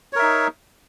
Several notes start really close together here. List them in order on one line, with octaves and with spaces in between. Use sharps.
C#5 A#4 E5 D#4